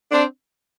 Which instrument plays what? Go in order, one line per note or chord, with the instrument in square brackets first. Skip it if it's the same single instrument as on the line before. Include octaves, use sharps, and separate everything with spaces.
[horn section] C4 D4